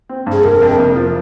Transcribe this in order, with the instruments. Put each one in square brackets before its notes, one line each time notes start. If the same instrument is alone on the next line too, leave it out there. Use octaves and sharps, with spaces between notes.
[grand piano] C4
G2
[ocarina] G#4
[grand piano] F1 [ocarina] A#4
[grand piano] F2
C3
F3